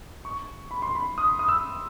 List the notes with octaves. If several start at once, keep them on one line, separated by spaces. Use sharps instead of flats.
C#6
B5
C6
B5
D#6
D#6
E6